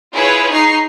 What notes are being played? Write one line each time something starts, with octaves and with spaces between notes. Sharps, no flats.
E4 F4 G#4 B4 C#5
D#4 C#6 C7